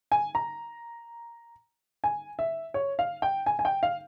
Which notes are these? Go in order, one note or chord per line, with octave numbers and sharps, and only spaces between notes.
G#5
A#5
G#5
E5
C#5
F5
G5
G#5
G#5
G5
F5